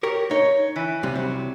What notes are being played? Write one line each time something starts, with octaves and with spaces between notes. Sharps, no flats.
G4 A#4 C#5
D#4 C#5
E3
C2 C3 G3
F#3